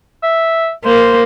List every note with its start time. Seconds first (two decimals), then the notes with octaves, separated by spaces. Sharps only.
0.23 E5
0.85 A#3 C5